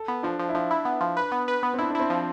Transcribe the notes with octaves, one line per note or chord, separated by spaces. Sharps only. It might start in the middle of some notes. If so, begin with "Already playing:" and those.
Already playing: A4
B3
F3 D4
F3
E4
F3 D4
E4
B3
F3
B4
B3
B4
B3
C4
D4 E4
D4
C4 E4
F3